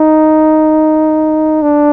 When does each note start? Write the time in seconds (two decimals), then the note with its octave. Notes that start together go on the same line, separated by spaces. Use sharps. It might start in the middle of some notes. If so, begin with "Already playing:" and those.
Already playing: D#4
1.62 D4